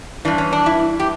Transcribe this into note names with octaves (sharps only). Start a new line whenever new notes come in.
G2 E3 D4
C#4
D4
E4
G4